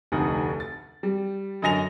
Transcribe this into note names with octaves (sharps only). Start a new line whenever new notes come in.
F1 D2 D#4 F#5
A6
G3
F#2 D3 D#5 G#5 A#6 F7